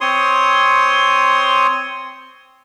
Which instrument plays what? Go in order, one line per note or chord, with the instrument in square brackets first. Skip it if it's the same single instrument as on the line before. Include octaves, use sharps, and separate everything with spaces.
[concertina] C4 C#5 C6 D#6